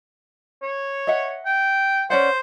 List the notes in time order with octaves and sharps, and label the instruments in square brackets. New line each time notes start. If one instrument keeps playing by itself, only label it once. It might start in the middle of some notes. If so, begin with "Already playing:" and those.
[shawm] C#5
[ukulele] D#5 E5 F#5
[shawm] G5
[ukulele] C#4 D5 F#5 [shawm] C5